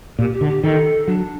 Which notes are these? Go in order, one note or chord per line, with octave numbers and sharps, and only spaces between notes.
A#2 G4
G4
D3
G4
D#3 A4
F#3 D4